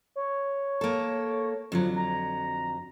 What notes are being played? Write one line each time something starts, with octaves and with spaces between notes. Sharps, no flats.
C#5
A#3 A4
F2 D3 F3 F#3
A#5